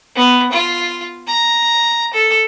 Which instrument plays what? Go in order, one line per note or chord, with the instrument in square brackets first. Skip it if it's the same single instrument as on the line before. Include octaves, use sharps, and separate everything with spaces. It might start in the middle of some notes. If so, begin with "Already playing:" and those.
[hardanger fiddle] B3
F4
A#5
A4